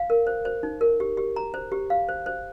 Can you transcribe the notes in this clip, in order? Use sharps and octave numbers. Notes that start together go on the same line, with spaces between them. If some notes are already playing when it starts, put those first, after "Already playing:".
Already playing: F5
A#4
C5
C5
D#4
A#4
G4
G4
A#5
C5
G4
F5
C5
C5